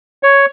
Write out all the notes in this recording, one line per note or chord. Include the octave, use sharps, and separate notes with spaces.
C#5